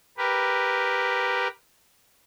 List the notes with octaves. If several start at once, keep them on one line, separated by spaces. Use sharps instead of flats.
G4 A#4 B4